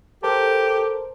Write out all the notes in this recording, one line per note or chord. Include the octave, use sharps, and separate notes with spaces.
G4 A4 A#4 C5 A5